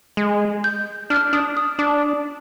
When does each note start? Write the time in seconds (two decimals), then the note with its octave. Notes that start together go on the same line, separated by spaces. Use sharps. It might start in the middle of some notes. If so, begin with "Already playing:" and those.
0.17 G#3
0.64 G6
1.10 D4 F6
1.33 D4 D#6
1.57 D#6
1.79 D4 D6